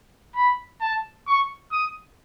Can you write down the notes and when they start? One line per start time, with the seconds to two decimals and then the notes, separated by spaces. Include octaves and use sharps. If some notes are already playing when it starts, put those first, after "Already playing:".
0.35 B5
0.81 A5
1.27 C#6
1.72 D#6